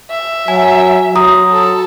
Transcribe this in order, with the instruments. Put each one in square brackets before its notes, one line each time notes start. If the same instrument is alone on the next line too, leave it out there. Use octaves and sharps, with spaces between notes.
[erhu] E5
[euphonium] F#3 [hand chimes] G#5
[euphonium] F#3 [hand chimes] F#4 A#5 D#6
[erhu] A4